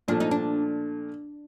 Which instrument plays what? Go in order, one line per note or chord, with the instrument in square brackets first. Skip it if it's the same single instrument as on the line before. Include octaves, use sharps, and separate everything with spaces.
[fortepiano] A#2 F3 A3 [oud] D4
[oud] D#4
D4